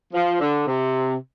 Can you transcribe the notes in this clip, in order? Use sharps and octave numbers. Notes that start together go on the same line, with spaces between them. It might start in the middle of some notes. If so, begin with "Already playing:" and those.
F3
D3
C3